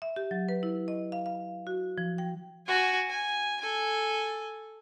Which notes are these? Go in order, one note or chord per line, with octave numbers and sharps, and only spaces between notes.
E5
G4
F#3
B4
E4
D#5
F5
F5
F#4
F3
G5
F#4 G#5
G#5
A4 G#5